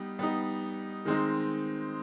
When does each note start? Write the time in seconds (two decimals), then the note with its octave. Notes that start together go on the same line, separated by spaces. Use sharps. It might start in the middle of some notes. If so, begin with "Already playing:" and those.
Already playing: G3 B3 D#4
0.19 G3 B3 D#4
1.05 D#3 G#3 C4 D#4